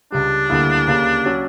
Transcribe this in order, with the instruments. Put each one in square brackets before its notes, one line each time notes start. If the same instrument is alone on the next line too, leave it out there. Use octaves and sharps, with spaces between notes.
[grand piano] C#2 C#3 G3 [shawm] D4
[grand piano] D2 D3 G3 A#3 E4
C#2 C#3 G3 A#3
F#3 C#4